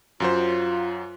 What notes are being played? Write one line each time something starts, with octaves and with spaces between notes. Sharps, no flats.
F#2 F#3 F4 C5